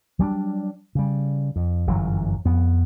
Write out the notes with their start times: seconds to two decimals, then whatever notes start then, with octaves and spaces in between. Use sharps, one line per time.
0.19 F#3 G3 C#4 D4
0.95 C#3 G3
1.56 F2
1.87 G1 F#2 E3 F#3
2.45 F2 B3